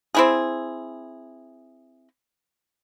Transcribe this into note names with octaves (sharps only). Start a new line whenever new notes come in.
C4 E4 G#4